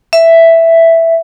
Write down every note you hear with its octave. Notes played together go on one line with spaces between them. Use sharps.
E5